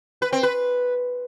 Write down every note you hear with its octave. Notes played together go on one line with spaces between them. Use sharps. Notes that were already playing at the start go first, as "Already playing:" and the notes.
B4
C4
B4